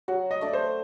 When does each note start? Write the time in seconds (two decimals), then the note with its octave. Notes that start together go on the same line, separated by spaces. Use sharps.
0.08 F#3 F#4
0.31 D#5
0.41 A3 D4 D5
0.53 C5